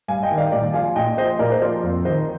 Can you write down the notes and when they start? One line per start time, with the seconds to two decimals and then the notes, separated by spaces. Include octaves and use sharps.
0.08 G2 F5 G#5
0.23 D#5 G5
0.30 D#3
0.38 D5 F5
0.52 A#2 D5 F5
0.74 F3 F5 G#5
0.96 A#2 D#5 G5
1.17 F3 C5 D#5
1.39 A#2 A#4 D5
1.52 C5
1.61 F3 A#4 D5
1.83 F2
2.05 D#3 C5 D#5